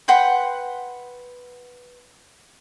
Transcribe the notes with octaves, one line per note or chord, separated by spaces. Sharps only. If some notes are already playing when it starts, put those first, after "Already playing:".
B4 F#5 G5 C6